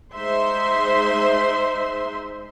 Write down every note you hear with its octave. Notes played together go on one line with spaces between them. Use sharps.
G#3 D#4 C5 E5 C6